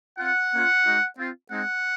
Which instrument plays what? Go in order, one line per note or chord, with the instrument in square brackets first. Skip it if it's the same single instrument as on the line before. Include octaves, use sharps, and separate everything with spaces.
[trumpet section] C4 F4 F#5
A#3 C#4 F4
G#3 D#4 F#4
C4 F4
G#3 C4 D#4 F#5